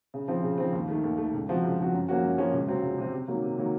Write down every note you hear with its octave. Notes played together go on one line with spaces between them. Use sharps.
C#3
F3 C4
C#3
F3 C4
D#2
D#3 A3
D#2
D#3 A3
C#2
C3 F3 C4 F#4
C#2
C3 F3 C4 F#4
F#2
F3 A#3 C#4 F#4
F#2
F3 A#3 C#4 F#4
C#2
C3 F#3 C4
C#2
C3 F#3 C4
C3
D#3 F#3 A#3
C3
D#3 F#3 A#3